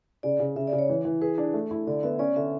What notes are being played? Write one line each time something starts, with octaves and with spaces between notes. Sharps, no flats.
C#3 D5
C#3
C#3 E5
D5
C#3
C#5
E3
E3
G#4 B4
D4
A3
E4
D3 D5
B3 E5
C#4 D5
D3 E5